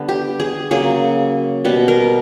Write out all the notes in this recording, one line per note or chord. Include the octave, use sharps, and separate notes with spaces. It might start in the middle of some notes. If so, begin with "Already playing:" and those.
Already playing: D3 G3 B3
G4
G#4
C#3 F#3 A#3 G#4
B2 G3 B3
A#4